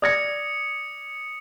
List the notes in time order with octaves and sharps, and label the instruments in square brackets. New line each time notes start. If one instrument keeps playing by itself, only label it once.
[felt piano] D5 G#6 A#6 [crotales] D#6 C#7